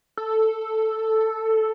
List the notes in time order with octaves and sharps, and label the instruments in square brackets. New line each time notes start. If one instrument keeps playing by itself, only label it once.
[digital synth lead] A4